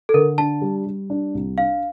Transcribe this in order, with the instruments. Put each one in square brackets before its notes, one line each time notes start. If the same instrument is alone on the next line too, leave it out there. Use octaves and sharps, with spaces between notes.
[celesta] A4
[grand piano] D3 [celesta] A#4
[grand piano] D4 [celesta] A5
[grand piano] G3
G3
D4
C2
[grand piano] D4 [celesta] F5